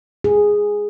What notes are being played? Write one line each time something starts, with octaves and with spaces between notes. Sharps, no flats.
G#4